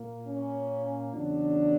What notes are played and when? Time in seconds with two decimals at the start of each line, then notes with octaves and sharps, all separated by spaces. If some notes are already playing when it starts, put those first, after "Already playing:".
Already playing: A#2 A#3
0.26 C#4
1.14 E2 C#3 F#3 D4